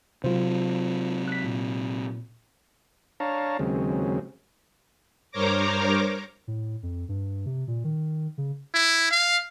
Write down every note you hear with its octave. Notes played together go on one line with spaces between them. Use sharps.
C3 F#3 F4 C5
F#6 B6
A#2
D4 C#5 F5 A5 A#5
D#2 C#3 F#3 G#3 C4
G2 A#4 C5 C#5 A#5 D6
A2
F2
G2
C3
A#2
D#3
C#3
E4
F5